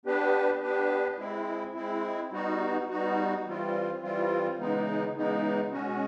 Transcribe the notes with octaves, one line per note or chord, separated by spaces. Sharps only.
B3 D4 G4 B4
B3 D4 G4 B4
G#3 C4 E4
G#3 C4 E4
G3 B3 D#4 F#4
G3 B3 D#4 F#4
E3 G3 C4 F4
E3 G3 C4 F4
C#3 E3 G#3 B3 D#4
C#3 E3 G#3 B3 D#4
B2 G#3 C#4 F#4